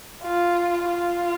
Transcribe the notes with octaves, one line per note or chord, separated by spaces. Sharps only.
F4
F4